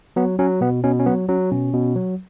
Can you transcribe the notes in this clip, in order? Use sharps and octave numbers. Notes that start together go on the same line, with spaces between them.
F#3 B3
F#3 C#4
B2 B3
B2 C#4
C#4
F#3 B3
F#3 C#4
B2 C#4
B2
F#3